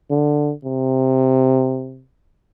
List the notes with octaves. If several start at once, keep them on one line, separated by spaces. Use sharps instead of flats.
D3
C3